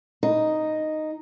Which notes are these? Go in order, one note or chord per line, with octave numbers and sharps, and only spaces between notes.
D#4